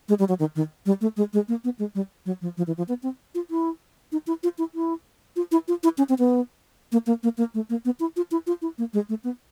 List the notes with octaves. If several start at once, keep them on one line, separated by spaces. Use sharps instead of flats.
G#3
G3
F#3
D#3
D#3
G3
A3
G#3
G#3
A#3
B3
G#3
G3
F#3
F3
F3
E3
F3
B3
C4
F4
E4
D#4
E4
F4
E4
E4
F4
E4
F4
E4
C#4
C4
B3
A#3
A#3
A#3
A#3
A3
A#3
B3
E4
F4
E4
F4
E4
A#3
G#3
A3
B3